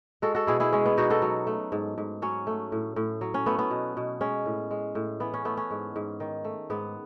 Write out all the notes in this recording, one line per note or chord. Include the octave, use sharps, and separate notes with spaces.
G#3 F#4 A4
F#4 A4
B2 E4 G#4
E4 G#4
G#3 C#4
B3
B2 D#4 F#4
F#4 A4
F#3
A3
G#2
G#2
F#3 C#4
A3
A2
A2
F#3
C#4
A3 B3
B3
B2
B2
G#3 C#4
A2
G#3
A2
E3 B3
C#4
A3 B3
C#4
G#2
G#2
D#3
A3
G#2 B3